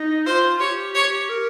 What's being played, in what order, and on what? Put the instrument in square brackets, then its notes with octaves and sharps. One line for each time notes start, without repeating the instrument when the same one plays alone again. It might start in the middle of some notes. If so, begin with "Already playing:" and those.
Already playing: [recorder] D#4
[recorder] F4 [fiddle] C5
[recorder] G4 [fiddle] C#5
[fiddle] C#5
[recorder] A#4